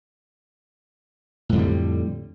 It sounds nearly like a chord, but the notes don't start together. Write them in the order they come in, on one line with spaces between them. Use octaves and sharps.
A2 F2 D3 G3